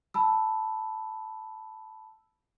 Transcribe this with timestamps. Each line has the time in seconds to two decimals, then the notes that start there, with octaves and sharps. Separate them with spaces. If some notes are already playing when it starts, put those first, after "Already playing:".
0.14 A5 B5 E6